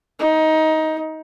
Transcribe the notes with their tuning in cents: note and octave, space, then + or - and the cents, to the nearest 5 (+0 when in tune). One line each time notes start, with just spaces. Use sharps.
D#4 +20